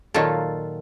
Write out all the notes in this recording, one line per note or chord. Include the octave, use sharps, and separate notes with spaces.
A#2 D#3 F#3 F4 A4